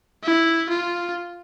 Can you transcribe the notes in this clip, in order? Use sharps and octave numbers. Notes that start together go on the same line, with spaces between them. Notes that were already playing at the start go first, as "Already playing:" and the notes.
E4
F4